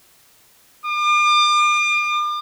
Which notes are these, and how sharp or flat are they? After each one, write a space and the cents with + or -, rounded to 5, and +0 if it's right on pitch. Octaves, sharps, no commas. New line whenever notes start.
D6 +40